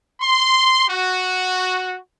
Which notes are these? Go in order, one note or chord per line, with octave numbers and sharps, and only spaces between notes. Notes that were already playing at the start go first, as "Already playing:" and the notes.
C6
F#4